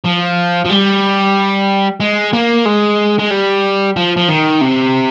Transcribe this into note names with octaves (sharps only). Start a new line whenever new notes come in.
F3
F3
G3
G#3
A#3
G#3
G#3
G3
F3
F3
D#3
C3